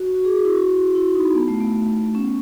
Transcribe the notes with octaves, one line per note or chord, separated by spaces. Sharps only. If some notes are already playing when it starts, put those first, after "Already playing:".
Already playing: F#4
F#4
G#4
G#4
E4
F#4
E4
D#4
B3
A3
B3
C#4